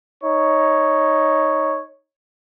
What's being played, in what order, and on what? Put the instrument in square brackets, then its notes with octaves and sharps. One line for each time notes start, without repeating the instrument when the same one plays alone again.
[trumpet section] D#4 C#5